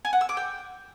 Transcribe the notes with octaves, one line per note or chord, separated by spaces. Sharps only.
G#5
F#5
E6
D6
G5